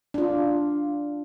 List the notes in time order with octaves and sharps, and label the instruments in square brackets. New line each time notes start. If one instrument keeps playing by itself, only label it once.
[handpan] D4 F4